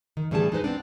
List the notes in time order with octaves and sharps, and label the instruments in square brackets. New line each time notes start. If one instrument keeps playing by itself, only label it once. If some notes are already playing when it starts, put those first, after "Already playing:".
[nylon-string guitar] D#3
A2 E3 G3 D4 G#4 A5
G#3 D#4 B4 C5
B3 C4 D4